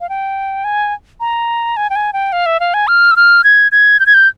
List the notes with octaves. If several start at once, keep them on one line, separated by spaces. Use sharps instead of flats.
F5
G5
G#5
A#5
G#5
G5
G#5
G5
F5
E5
F5
G#5
F6
E6
F6
G#6
G#6
G6
G#6
G6